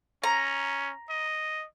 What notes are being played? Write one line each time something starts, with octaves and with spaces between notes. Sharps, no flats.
C#4 A#5
D#5